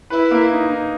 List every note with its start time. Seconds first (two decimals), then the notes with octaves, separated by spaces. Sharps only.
0.10 E4 B4
0.31 A#3
0.51 D#4
0.70 D#4